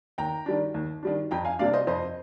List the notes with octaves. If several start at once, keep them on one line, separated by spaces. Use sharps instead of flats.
D#2 G5 A#5
D#3 G3 D4
D#2
D#3 G3 D4
F2 G5 A#5
F5 G#5
C3 G3 A#3 D4 D5 F5
C5 D#5
F2 C5 D#5